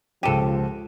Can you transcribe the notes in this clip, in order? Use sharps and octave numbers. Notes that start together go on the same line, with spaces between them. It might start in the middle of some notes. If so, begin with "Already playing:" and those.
C#2 F3 G4 A4 D#7